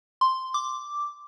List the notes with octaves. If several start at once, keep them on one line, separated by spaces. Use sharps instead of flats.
C6
D6